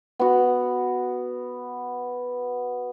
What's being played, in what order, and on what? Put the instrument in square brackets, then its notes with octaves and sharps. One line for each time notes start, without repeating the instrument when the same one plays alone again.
[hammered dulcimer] B3 F#4